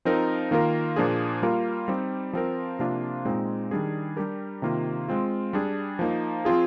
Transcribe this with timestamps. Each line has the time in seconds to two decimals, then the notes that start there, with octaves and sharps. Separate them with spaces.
0.05 F3 C4 D#4 A#4
0.51 D#3 A#3 F4 A#4
0.96 A#2 F3 A#3 D4 G#4
1.42 G3 A#3 F4 A#4
1.88 G3 C4 D#4 G4
2.33 F3 C4 F4 A#4
2.79 C3 F3 A#3 D4 F4
3.25 A#2 G#3 C4 D#4
3.71 D#3 G3 D4 G#4
4.17 G3 D4 G4 A#4
4.62 C3 D#3 A#3 F4
5.08 G#3 C4 F4
5.53 G3 D4 G#4
5.99 F3 A#3 D#4
6.45 F3 C4 F4 G#4